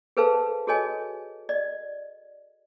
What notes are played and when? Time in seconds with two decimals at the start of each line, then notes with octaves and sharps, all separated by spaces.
0.17 G#4 A4 B4 C5 F5 A5
0.67 F#4 G#4 A4 C#5 D#5 G#5
1.49 D5 D#5